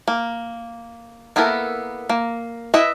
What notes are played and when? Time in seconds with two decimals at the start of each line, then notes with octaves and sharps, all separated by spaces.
0.08 A#3
1.36 A#3 B3 E4 A4 A#4
2.09 A#3
2.74 E4 B4 D#5 E5